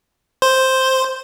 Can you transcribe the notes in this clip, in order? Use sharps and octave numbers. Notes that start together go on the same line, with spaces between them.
C5